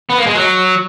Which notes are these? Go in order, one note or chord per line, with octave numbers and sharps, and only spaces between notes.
B3
A#3
G#3
F#3